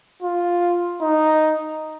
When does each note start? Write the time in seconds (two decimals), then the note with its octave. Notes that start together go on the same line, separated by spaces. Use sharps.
0.22 F4
1.02 D#4